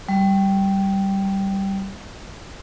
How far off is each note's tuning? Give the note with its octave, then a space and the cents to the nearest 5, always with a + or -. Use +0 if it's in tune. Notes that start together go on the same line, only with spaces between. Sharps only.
G3 -10